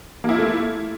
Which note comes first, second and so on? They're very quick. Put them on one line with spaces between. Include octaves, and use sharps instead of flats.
A#3 E4 F4 A3